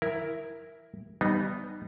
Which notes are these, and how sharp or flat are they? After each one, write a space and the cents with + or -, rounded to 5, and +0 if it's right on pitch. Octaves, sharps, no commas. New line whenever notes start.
E4 +0 A#4 +0
G3 -10 B3 +5 D#4 -20